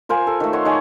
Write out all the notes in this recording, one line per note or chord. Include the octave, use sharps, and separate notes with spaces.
F4 A#4 C5 G#5
A4
D#3 A3
C#5 F#5 C6
D#4 G#4 C#5 G#5